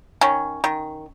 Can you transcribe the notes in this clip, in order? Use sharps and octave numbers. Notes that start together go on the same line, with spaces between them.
D#3 C#4
D#3